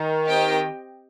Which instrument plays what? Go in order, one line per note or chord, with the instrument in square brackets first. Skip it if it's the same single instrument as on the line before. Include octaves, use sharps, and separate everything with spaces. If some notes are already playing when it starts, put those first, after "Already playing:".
Already playing: [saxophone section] D#3
[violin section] C4 G4 D#5 G5